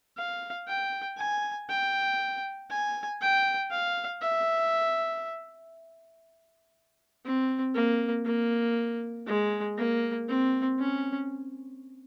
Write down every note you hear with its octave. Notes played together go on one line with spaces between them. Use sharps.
F5
G5
G#5
G5
G#5
G5
F5
E5
C4
A#3
A#3
G#3
A#3
C4
C#4